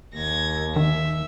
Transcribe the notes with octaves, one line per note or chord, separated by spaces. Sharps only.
D#2 G#6 A#6
D#3 E5